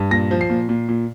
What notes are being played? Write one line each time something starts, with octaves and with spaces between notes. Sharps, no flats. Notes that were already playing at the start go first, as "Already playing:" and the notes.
Already playing: G2
A#2 A#6
F3
C7
A#2
A#2
A#2